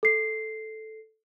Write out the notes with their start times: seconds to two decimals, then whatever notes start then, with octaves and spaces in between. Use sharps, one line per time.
0.03 A4 C7